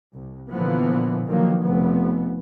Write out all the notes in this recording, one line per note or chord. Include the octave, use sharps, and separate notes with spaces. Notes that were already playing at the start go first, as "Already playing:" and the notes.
C2
A#2 D3 E3 F3 B3
B2 D3 D#3 F3 F#3 A#3
F1 C3 B3